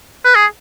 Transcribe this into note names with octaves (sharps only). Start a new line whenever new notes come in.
B4
G#4